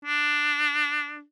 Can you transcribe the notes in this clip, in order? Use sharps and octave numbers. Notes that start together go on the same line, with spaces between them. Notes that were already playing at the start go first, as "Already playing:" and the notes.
D4